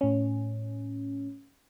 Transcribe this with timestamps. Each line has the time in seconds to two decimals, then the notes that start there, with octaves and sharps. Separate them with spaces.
0.01 A2 C#4